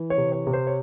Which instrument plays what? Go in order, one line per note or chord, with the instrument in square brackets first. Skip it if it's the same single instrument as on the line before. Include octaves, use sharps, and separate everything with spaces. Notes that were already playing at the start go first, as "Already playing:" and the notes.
Already playing: [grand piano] E3
C#5
C3
C#5
C3
C5
C#5